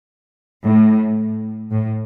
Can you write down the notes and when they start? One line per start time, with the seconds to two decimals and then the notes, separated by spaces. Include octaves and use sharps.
0.64 A2
1.71 A2